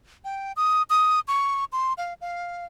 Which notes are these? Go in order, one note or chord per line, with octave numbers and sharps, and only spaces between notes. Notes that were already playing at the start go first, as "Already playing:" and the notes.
G5
D#6
D#6
C#6
C6
F5
F5